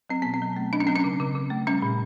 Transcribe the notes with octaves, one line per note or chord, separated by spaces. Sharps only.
F#3 C4
B2 B3
C4
F#3
A3
F#3 D4
C#4
F#3 C4
C#4
C#3
C#3
C#3
A3
G3 C#4
A#2